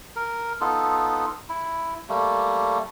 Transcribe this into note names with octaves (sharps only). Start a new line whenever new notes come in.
A#4
B3 D#4 F4 A4
E4
G3 A3 A#3